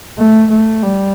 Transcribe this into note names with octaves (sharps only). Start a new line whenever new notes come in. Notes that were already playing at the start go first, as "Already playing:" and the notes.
A3
A3
G3